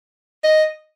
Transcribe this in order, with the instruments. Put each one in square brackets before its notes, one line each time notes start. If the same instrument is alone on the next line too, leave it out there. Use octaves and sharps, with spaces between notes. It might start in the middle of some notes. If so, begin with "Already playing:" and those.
[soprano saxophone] D#5